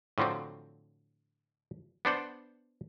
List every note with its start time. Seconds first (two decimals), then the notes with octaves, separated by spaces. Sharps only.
0.18 A2 D3 F3 F#3 C4
2.05 B3 D4 C5 F#5